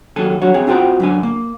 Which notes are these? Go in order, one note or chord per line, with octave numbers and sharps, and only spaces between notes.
D#2 F#3 A4 G#5
D3 F#3 F#4 C#5
C4 G#4
C4 F4 F#4 C5 G5 A#5
F#2 D3 G#5
A#3